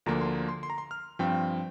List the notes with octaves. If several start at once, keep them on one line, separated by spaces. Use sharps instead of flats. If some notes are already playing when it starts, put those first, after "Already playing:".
D2 D3 F3 A#3 A#5
C6
C6
C6
A#5
C6
F6
G2 F3 C4 G5